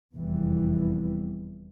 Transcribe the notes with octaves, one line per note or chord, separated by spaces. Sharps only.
F1 E2 E3 G3